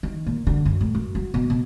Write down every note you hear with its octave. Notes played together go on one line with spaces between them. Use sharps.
D#3
A#2
D3
F#2
A2
F#2
F#3
B2
B2